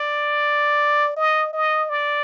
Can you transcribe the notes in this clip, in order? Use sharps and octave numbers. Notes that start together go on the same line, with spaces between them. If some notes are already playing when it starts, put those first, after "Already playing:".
Already playing: D5
D#5
D#5
D5